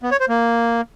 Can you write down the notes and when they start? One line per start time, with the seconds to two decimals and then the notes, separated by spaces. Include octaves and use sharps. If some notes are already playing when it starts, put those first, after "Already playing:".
0.03 B3
0.11 C#5
0.20 C5
0.29 A#3